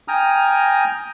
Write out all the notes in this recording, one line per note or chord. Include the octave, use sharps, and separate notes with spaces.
G5 G#5 A#5 D#6 F6